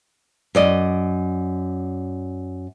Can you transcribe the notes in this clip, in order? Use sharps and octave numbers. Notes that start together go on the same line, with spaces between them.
F#2 D5 D#5